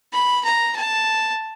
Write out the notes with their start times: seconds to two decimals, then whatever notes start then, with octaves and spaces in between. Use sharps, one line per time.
0.13 B5
0.45 A#5
0.76 A5